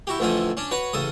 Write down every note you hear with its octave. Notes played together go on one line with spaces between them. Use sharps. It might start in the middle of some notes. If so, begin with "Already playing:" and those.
E4 F#4 G4
A1 F2 D3 F3 A3 G#5
C#4 D4
F#4 B4 C#5 F#5
A1 C#3 A4 D#6